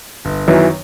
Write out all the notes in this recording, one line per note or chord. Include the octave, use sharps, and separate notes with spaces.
G1
F#2 D#3 E3 F#3 B3